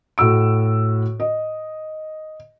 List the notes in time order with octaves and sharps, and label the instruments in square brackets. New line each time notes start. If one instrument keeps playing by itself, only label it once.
[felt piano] A2 F#4 E6 D7
D#5